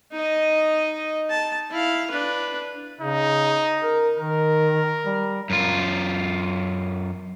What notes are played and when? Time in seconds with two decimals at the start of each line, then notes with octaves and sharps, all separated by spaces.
0.12 D#4 D#5
1.30 A5
1.71 E4 F5
2.11 D4 B4
3.01 C#3 D#4
3.83 A#4
4.17 D#3 A#4
5.06 G3
5.50 F#2 F4